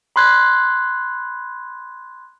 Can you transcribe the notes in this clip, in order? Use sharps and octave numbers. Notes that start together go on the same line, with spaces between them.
B5 C6 F#6 G#6